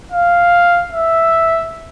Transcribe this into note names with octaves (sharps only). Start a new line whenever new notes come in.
F5
E5